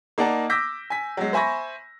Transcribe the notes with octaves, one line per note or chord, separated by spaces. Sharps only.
A#3 D#4 D5 F#5 A5 A#5
D6 E6 G6 A#6 B6
G#5 B6
F#3 G#3
C5 E5 G#5 B5 C#6 A#6